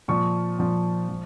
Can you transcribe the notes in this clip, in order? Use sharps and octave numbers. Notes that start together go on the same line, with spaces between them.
A#2 F3 C#6
A#2 F3
F3